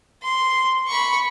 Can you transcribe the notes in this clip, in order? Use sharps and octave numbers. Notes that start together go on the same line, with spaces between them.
C6
B5 C#6